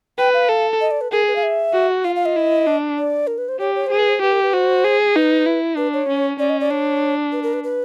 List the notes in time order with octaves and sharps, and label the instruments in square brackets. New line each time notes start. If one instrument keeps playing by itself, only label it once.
[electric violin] B4 [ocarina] G5
[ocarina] F5
[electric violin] A4
[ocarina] D#5
D5
B4
[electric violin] G#4 [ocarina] A#4
[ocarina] B4
F5
E5
[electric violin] F#4
[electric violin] F4 [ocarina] F5
[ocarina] F5
D#5
[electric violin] E4
D4
[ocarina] D5
A#4
B4
C5
[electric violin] G4 [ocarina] C#5
[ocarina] C#5
[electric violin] G#4 [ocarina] C5
[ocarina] B4
C5
[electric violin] G4 [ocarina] B4
[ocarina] A#4
B4
[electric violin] F#4 [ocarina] C5
[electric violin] G#4
[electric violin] D#4 [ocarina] B4
[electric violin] E4
[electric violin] D4 [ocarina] B4
[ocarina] C#5
[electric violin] C#4
[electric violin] C#4 [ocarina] D5
[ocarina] D#5
D5
[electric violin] D4 [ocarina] C#5
[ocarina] B4
A#4
B4
B4